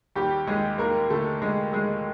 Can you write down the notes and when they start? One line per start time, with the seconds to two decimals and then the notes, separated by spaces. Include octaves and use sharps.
0.15 D#2 G3 G4
0.47 D#2 G#3 G#4
0.78 D#2 A#3 A#4
1.10 D3 A3 A4
1.42 D3 G#3 G#4
1.73 D#2 G#3 G#4